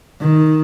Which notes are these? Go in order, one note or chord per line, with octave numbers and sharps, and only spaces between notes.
D#3